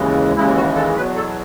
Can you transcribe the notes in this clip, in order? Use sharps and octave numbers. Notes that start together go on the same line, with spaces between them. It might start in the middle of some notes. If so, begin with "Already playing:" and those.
Already playing: D#2 C#3 E3 G#3
D#2 C#3 E3 G#3 E4
F#4
A4
E2 B2 F#3 B4
A4